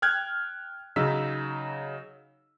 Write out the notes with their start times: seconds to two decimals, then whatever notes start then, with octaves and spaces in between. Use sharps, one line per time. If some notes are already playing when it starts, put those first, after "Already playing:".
0.02 G5 F6 F#6 G#6
0.96 C#3 F#3 D#4 E6 B6